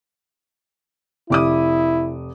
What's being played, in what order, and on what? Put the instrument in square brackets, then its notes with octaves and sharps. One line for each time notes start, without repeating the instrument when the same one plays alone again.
[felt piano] F1 D6 D#6 [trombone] E4